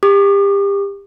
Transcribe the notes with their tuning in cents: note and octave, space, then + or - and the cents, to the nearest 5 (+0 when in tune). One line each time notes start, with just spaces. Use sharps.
G4 +30 D6 +45